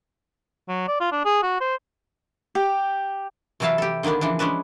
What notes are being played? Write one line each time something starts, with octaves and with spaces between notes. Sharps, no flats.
F#3
D5
F4
D4
G#4
F#4
C5
G4
C3 E3 F#3 E4 F5 A5
G4 A4
D3 D#3 A#3 B3 D4
C#3 E3 F3 D4
G#3 C#4 D4 B4